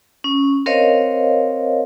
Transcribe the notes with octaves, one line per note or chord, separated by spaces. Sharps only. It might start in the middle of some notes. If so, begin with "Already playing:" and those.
C#4
C4 A#4 C5 C#5 D#5 F5